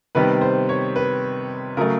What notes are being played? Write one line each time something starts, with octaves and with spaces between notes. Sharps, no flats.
C3 D#3 G3 B3 B4
C5
C#5
B4
C#3 F#3 A3 A#4